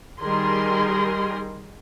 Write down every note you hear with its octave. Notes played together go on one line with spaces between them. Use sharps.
D#3 G3 G#4 A#4 C6